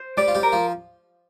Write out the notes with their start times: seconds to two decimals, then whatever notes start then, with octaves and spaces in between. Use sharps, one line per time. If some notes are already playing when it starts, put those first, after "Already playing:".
Already playing: C5
0.17 G3 G4 D5
0.28 F4
0.35 G3 G4
0.43 A#4
0.52 F3 F4